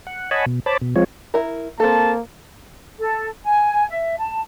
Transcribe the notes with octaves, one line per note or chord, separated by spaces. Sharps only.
F#5
C#5 D#5 F#5 G#5 A5 B5
B2
C5 C#5 A5 B5 D6
B2
F3 G#3 C4 F4 C#5
E4 A#4
A#3 C4 A4 A5
A4
G#5
E5
A5